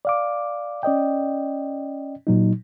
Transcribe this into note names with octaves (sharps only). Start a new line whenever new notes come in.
D5 F5 D6
C#4 D5 D#5 G5
A#2 F#3 D#4